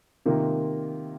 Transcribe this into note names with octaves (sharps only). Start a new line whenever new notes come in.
C3 D#3 A#3 F4